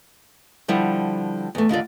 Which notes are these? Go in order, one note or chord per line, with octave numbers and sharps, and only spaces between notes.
D3 F3 G3 E4 F#5
E2 A3
D#2 D3 F4 D5